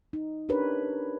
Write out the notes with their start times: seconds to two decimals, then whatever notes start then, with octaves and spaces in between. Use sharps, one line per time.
0.13 D#4
0.49 C#4 D4 G4 A#4 B4 C#5